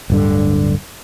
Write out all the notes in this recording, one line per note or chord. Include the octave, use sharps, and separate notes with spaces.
D1 G2 D3